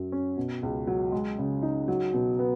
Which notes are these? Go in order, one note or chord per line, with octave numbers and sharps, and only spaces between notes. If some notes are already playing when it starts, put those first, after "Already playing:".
Already playing: F#2 F#3
C#4
B2
C#2
F#3
G#3
C#3
D#4
F#3
B2
B3